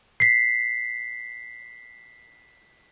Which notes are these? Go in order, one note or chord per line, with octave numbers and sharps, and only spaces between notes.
B6 C7